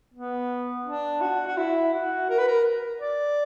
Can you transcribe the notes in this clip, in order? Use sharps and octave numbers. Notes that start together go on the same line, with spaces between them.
B3
D4
F#4
F#4
E4
F#4
A#4
B4
A#4
D5